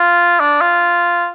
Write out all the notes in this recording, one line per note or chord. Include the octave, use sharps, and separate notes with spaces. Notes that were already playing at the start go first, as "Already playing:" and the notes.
Already playing: F4
D4
F4